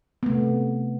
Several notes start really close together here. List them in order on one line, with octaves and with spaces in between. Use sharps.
B3 A3 C3